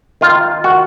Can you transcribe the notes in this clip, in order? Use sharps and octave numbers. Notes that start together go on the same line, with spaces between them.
D#3 F4
F#4